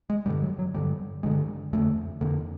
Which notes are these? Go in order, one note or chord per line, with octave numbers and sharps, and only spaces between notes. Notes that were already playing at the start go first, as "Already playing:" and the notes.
G#3
G2 D3 G3
F#3
F#3
G2 D3 G3
G2 D3 G#3
F2 D3 A3
F2 D3 A#3